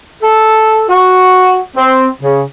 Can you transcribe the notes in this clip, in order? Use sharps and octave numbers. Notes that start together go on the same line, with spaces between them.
A4
F#4
C4
C#3